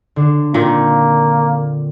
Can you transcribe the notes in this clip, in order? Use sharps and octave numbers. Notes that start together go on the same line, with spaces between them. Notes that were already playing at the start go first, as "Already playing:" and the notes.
D3 D4
A#2 D#3 A#3 C4